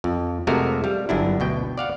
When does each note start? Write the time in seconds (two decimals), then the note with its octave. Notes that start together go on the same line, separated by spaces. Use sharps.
0.04 F2
0.47 F2 C3 G#3 A3 F#4 A#4
0.84 G3 F5
1.09 G1 F#2 D4 E4
1.40 D2 B2 G5
1.78 D5 F5 F#5